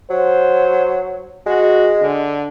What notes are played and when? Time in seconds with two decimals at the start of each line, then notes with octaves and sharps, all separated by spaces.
0.10 F#3 C5
1.46 G#3 F#4
2.01 D3